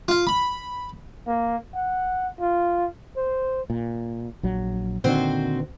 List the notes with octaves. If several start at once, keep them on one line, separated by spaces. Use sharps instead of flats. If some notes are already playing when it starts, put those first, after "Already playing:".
F4
B5
A#3
F#5
F4
C5
A#2
A#1 F#3
A#2 D3 D#3 C4 F#4 C5